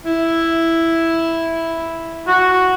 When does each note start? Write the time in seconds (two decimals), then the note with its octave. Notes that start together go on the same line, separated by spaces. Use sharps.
0.05 E4
2.27 F#4